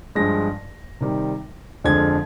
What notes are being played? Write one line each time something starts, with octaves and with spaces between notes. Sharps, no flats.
G2 F3 G#3 A#6
C3 D#3 G3
F2 D3 F3 G#3 G#6